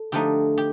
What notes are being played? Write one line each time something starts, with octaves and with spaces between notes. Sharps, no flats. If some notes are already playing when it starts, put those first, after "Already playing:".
Already playing: A4
D3 F3 A3 D#4 G4
G4